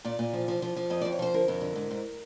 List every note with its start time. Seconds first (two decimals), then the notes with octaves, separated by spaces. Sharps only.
0.05 A#2 D5
0.19 A#2
0.33 F3
0.48 F3
0.62 F3
0.76 F3
0.90 F2 D#5
1.01 F2 D5
1.12 C#5
1.19 F3 C5
1.34 D3 A#4
1.48 F2
1.61 D3
1.75 G#2
1.91 G#2